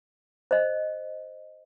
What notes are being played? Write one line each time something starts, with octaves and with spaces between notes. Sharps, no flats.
C5 D#5